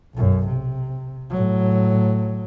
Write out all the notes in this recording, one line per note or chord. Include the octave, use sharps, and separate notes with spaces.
B1 F#2
C3
A2 F#3